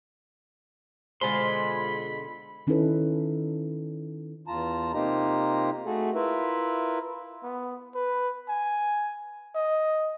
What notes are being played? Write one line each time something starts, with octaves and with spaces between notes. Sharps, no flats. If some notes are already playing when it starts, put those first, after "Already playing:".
B2 D3 G#3 F4 G#4 C5 B5 C6
D#3 C#4 D#4 E4 A4 B4
E2 F4 A5 A#5
C3 A#3 D#4 F4 G4 A#5
A3 F#4 G#4 A4
E4 F4 A#4 B4 E5
B3
B4
G#5
D#5